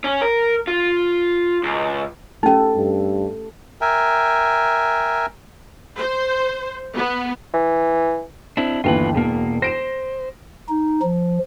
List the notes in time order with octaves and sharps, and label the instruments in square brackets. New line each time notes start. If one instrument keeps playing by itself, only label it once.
[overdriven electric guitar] C#4
A#4
F4
C#2
[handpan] A3 G4 A4 [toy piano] C#4 D#4
[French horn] G2
[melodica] A#4 E5 G5 G#5
[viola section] C5
B3
[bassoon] E3
[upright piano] C4 [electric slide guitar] D4 E4
[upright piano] G1 D#2 E3 [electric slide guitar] F4 A#4 B4
[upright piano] E1 [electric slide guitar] B2 A#3
[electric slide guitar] C5 [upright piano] A#6 D7 E7
[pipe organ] D#4
F3